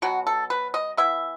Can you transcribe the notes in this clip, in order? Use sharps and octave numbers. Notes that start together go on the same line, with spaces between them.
B2 F#3 B3 F#4
A4
B4
D#5
E3 B3 E4 E5